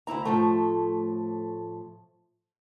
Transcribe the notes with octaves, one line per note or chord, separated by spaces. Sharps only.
D2 G2 E4 A#5
A2 F3 A3